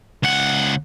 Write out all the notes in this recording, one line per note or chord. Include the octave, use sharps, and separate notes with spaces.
C#2 F#5